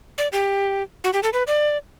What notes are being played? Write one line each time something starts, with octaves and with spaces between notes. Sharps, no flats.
D5
G4
F#4
G4
A4
B4
D5